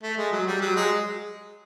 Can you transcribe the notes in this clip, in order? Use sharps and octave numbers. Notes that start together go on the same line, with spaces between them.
A3
G#3
F#3
G3
F#3
G#3